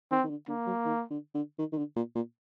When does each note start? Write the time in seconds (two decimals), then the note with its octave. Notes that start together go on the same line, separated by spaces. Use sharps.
0.11 D#3 C4
0.24 D#3
0.30 D3
0.48 D3 A#3
0.66 F#3
0.85 D#3
1.10 D3
1.34 D3
1.59 D#3
1.73 D#3
1.78 D3
1.96 A#2
2.15 A#2